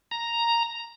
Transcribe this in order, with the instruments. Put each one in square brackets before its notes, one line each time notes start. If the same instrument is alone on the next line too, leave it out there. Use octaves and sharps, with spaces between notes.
[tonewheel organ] A#5